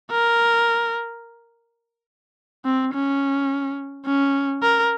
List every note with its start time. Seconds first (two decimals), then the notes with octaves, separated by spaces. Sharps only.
0.11 A#4
2.65 C4
2.94 C#4
4.06 C#4
4.63 A#4